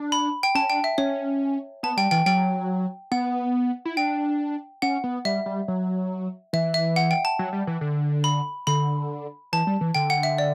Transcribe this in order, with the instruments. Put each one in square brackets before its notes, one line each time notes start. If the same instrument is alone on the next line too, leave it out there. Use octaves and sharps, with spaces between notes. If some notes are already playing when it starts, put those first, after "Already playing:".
Already playing: [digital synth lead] D4
[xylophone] B5
G5
[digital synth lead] C#4 [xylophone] A5
[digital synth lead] D4 [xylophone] G5
[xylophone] E5
[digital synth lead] C#4 [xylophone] C#5
[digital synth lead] B3 [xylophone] A5
[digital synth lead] G3 [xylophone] G5
[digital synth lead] E3 [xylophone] G5
[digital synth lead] F#3 [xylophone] G5
[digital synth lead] B3 [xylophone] F#5
[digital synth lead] E4
[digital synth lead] D4 [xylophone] G5
[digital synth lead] C#4 [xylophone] F#5
[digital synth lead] B3
[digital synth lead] G3 [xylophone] E5
[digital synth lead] G3
F#3
[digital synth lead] E3 [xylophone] E5
[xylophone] E5
F#5
G5
A5
[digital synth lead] F#3
G3
E3
D3
[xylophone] B5
[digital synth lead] D3 [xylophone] B5
[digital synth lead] E3 [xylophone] A5
[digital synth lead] G3
E3
[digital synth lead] D3 [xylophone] G5
[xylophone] F#5
E5
D5